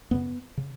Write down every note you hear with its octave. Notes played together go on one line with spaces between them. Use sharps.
F#2 C#3 B3
C#3